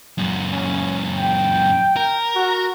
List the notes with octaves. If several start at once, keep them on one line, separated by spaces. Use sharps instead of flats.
F#2 A#2
C#4
G5
A#4
F#4